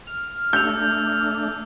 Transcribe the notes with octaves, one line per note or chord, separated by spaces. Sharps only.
F6
A3 D4 E6 G6 F7